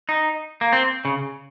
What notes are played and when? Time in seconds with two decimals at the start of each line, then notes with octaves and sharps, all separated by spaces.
0.09 D#4
0.61 A#3
0.73 C4
1.05 C#3